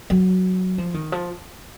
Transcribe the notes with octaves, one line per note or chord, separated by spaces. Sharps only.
F#3
F3
D#3
F3